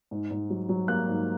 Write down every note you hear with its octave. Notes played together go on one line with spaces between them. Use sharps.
G#2
G#2
F#3
F#3
A#3 F#6
G#2